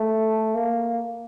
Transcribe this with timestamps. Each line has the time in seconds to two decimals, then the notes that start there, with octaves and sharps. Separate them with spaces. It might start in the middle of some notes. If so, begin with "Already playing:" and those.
Already playing: A3
0.54 A#3